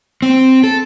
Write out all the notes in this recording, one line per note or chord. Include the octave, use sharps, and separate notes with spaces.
C4
A4